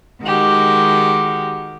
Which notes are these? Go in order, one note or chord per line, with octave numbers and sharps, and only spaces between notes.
D#3 G#3 F#4 G4